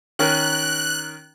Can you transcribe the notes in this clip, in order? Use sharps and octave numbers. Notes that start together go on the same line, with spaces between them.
D#3 C#4 A#4 F#6